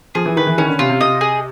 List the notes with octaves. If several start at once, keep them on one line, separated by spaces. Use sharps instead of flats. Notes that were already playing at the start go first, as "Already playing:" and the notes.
F3 G#4
E3
D#3 B4
E3
D#3 C#4
D3
C3 F4
C3
C3 D#5
G#4